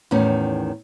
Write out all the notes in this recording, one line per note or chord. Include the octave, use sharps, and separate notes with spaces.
E2 A2 D#3 C#4